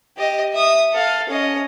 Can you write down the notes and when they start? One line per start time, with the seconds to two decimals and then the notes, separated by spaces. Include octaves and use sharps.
0.17 G4 D#5
0.53 E5 D#6
0.93 A4 F5
1.29 C#4 D#5